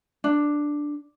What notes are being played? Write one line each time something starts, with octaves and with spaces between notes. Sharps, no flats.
D4